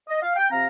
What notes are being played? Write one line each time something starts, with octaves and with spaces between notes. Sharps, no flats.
D#5
F5
G5
C3 F3 C4 F5 A#5